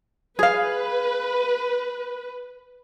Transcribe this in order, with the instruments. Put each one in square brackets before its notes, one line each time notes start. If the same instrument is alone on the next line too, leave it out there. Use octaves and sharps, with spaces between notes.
[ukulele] G#4 F5 [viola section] B4